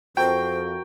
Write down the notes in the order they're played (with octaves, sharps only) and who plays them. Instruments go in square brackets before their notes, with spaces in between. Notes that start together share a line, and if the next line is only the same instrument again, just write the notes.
[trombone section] F2 [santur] F#4 A#4 A5 [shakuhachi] C5 [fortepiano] G5